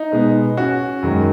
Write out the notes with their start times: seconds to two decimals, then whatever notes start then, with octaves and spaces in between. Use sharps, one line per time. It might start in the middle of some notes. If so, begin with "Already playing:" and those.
Already playing: D#4
0.12 B2 G#3 B3
0.57 C#4 F#4
1.03 F#2 D#3 G#3